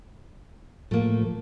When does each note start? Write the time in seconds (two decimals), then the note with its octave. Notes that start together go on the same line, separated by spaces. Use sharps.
0.91 A2 F3 A3 A#3